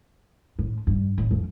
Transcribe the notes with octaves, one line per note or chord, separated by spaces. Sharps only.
A2
G2
A1
F2